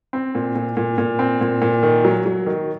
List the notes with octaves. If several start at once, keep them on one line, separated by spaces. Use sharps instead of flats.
C4
A#2
A#2
A#2
A#2
C4
A#2
A#2
D#3
F#3
F#3
D#3